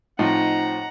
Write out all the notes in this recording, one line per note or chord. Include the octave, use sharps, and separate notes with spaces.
A2 F3 C4 D#4 F#5 A#5